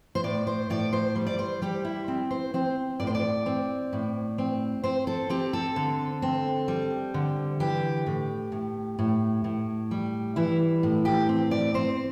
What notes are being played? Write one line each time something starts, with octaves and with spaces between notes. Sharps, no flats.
C5
A2 D5
C5
A2 D5
C5
G3
D5
C5
G3 G4
E4
C4
C5
C4 C5
A2 D5
C5
D5
C4
A2
C4
C4 C5
A4
C4 G4
A4
D3
C4
G3
D3
E3 G4
A2
A2
A2
A2
G3
E3 E4
A2
G4
C4
D5
C4 C5